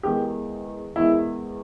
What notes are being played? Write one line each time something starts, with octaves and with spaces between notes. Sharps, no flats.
E2 D#3 G#3 G4
E2 D#3 G#3 E4